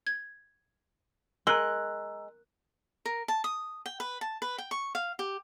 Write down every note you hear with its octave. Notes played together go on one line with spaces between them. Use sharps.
G#6
G#3 A#4 A#5 E6 F#6
A#4
A5
D#6
G5
B4
A5
B4
G5
C#6
F5
G4